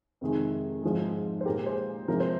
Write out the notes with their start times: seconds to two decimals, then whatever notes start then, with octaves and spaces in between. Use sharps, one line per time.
0.21 F2 C3 D#3 G#3
0.83 G#2 F3 G#3
1.41 C5
1.45 A#2 G#3 G4 A#4
1.66 G#4 C5
2.08 C3 F3 G#3 A#4
2.20 C5